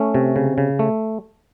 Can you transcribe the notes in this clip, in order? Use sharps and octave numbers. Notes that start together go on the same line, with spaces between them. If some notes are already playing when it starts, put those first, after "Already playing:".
Already playing: A3 C#4
C3
C#3
C#3
A3